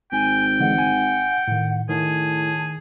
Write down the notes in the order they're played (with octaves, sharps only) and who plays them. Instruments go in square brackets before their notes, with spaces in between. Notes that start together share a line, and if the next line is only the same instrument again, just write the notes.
[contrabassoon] G#1 [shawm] G5 [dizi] G#5
[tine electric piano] D3 E3 G#3 [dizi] F#5
[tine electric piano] G#5
A2 D#3
[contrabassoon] A2 [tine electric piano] D#3 [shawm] G#4 [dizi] A5